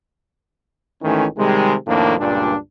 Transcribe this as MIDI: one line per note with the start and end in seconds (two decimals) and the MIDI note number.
1.02 1.26 32
1.02 1.26 51
1.02 1.26 52
1.02 1.26 57
1.02 1.26 61
1.37 1.75 48
1.37 1.75 51
1.37 1.75 55
1.37 1.75 56
1.87 2.15 41
1.87 2.15 45
1.87 2.15 51
1.87 2.15 58
1.87 2.15 62
2.18 2.55 37
2.18 2.55 43
2.18 2.55 46
2.18 2.55 62